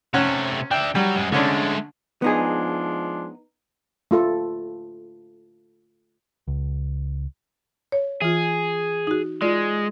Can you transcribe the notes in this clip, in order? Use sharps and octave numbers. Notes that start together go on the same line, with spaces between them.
C3 A3 C#4 F#5
D4 E5 G5
F#3 G3
F#2 G#3
D3 G#3 A3 C#4 D4
F3 G#3 B3 D4 D#4 G#4
A3 F4 A4
C#2
C#5
E3 F4 G#4
D#4 F#4
G#3 F4 D5